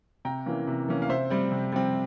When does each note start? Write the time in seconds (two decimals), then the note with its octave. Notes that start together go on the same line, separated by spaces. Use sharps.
0.25 C3 G5 A#5
0.46 E3 A#3 C#4
0.67 C3
0.88 E3 A#3 C#4
1.02 F5
1.09 C3 C5 E5
1.30 G3 C4
1.52 C3
1.72 G3 C4